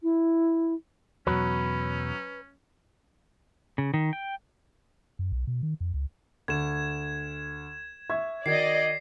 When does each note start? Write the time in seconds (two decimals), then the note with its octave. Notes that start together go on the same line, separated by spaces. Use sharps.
0.02 E4
1.27 E2 B2 F#3 C#4 B4
3.78 C#3
3.94 D#3
4.13 G5
5.19 F#2
5.32 B1
5.47 B2
5.63 D#3
5.80 F2
5.94 C#2
6.48 D2 G#6 E7
8.10 E5 C#6 G#6
8.46 D#3 F#4 D5 D#5 G#6 C7